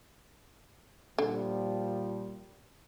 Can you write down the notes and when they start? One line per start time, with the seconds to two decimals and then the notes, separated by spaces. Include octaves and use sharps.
1.18 A#2 D3 F3 G3